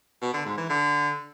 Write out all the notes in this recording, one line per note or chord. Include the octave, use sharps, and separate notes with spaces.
B2
D3
G#2
E3
D3